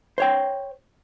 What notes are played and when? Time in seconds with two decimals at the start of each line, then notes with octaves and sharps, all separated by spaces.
0.18 C5 C#5 G5